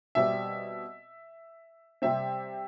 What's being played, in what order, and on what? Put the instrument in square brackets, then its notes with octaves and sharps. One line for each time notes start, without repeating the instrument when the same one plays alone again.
[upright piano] B2 G3 C4 E5
C3 G3 C4 E5